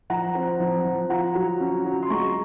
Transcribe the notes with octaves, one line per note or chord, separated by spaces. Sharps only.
F3 F#5 A#5
C4
F3
F3
F4 F#5 A#5
F#3
C#4
F#3
C6
G#3 A#5 C#6